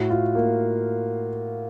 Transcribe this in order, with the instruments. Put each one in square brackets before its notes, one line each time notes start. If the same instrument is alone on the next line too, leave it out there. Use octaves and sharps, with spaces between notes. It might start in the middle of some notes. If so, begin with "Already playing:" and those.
Already playing: [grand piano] A2 F#4
F4
A#3